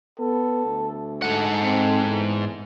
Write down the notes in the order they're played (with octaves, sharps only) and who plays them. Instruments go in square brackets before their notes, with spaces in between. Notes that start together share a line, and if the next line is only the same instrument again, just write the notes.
[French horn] B3 [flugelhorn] A4
[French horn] D2
[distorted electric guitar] G#2 F#5 [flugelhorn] A4
[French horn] C4
E2